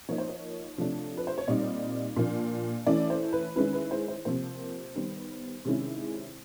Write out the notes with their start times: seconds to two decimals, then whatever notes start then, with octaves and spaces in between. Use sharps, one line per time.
0.09 F3 A#3 D#4 C#5
0.18 C5
0.28 C#5
0.78 C3 F3 A3 D4
1.17 B4
1.27 C5
1.38 C#5
1.48 A#2 G3 C4 D#4 D5
2.16 A#2 F3 A#3 D4
2.86 E3 A3 C#4 E4 D5
3.10 C5
3.33 B4
3.56 D#3 G#3 C#4 E4 B4
3.73 B4
3.91 C5
4.08 C5
4.25 C3 F3 A#3 C5
4.95 D#3 G3 B3
5.65 C3 D#3 G#3 C#4 E4